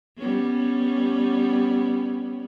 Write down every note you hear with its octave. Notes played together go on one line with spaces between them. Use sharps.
G3 B3 C#4